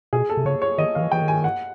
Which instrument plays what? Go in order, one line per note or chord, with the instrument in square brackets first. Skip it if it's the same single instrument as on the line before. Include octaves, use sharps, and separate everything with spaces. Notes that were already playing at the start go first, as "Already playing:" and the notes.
[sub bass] B2 [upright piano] G#4
[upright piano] A4
[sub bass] C3
[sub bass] C#3 [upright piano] C#5
[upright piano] C#5
[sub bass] D#3 [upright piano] D#5
[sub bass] D#3 [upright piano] F5
[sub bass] E3
[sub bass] E3 [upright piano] G5
[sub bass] D#3
[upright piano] G#5
F#5